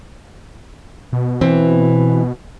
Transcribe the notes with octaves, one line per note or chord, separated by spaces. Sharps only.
B2
E3 C4